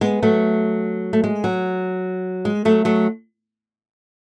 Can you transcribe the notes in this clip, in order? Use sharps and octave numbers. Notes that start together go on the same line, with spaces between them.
G#3 B3
F#3 A3
A3
G#3
F#3
G#3
F#3 A3
F#3 A3